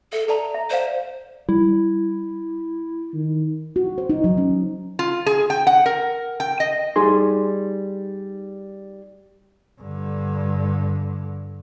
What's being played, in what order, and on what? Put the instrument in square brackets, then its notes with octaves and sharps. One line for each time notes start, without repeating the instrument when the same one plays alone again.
[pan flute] A4 [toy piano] E5
[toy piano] A4 D5 A5 [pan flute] A#5
[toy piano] E5
[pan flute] C5 [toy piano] D5 F5
[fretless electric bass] G3 [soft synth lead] E4
[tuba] D#3
[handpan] F#4
C5
D#4
F#3
C#4
[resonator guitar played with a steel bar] F4
G#4
G5
F#5
A#4
G5
D#5
[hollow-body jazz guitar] G3 D#4 G#4 C6
[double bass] G2 D3